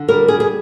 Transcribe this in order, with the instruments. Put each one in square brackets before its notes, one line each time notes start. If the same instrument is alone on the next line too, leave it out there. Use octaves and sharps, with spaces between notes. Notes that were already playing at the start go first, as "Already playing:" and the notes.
Already playing: [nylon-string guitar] D3
G3 A#4
G#4
G#4